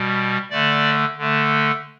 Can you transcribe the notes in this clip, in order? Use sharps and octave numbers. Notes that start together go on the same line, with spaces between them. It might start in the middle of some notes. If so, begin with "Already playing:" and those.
Already playing: B2 G3
D3 A3 D5
D3 A3